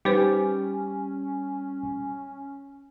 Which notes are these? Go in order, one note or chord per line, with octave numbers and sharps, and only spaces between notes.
G3 C#4 D#4 G4 B4 C5